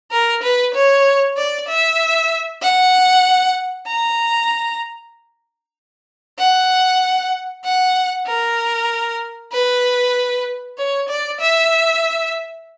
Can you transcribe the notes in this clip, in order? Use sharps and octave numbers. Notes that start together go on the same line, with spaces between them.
A#4
B4
C#5
D5
E5
F#5
A#5
F#5
F#5
A#4
B4
C#5
D5
E5